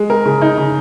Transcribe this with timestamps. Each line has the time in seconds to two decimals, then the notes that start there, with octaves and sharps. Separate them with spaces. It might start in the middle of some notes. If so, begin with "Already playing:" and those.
Already playing: G#3
0.10 A#4
0.25 C#3
0.42 D#4
0.58 C#3